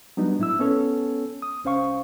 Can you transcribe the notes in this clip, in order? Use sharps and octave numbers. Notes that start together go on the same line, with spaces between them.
F#3 G3 B3 D4 D#4
A2 E4 E6
B3 C#4 A4 C#5
D#6
C2 C#4 C5 F5 C#6